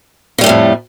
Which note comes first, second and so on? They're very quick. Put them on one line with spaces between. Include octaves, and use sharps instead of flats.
C#3 G3 A2 A3 F2